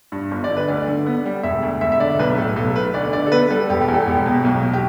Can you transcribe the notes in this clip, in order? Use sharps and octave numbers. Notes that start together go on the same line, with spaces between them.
G2
G1
D5
D3
B4
D2 D5
D3
B3
G3
E1 E5
D2
E1 E5
E5
D3 D5
B1 B4
A2 A4
B1 A4
A3 B4
D2 D5
D3 D5
A4
B3 B4
G3 A4
E1 G4
G4
E2
A4
E1 G4
B2
B1
B2
G4